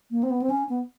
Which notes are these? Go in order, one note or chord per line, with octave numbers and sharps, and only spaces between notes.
A#3
C4
B3
C4
C#4
B3